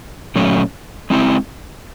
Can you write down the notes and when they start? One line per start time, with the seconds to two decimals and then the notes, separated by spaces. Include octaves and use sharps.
0.35 A#2 F#3 A3 C#4
1.10 G#3 C4 E4